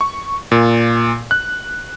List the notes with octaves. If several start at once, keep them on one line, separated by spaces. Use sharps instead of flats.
C#6
A#2
F#6